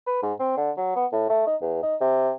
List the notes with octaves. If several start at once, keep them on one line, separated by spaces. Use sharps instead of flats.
B4
G#2
C4
D3
F#3
B3
A2
A3
D#4
E2
D#4
C3